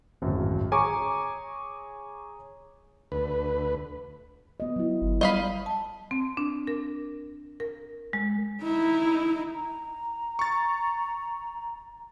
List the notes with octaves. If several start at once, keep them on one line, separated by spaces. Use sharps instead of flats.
D1 G#1 F#2
G#4 C#5 G#5 A#5 C#6 D6
D2 B4
B3 D#5
F#3 E4
G1
G3 D#5 F5 B5
A5
C4
D4
A#4
A#4
G#3
D#4 E4
A#5
C#6 A6